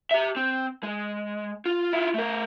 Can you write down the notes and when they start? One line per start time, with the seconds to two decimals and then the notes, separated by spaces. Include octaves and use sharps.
0.11 G4 E5
0.36 C4
0.83 G#3
1.66 F4
1.93 E4 F4
2.14 A3 A#4